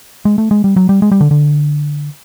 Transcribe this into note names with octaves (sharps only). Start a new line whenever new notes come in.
G#3
A3
G#3
G3
F#3
G3
G#3
G3
D3
D3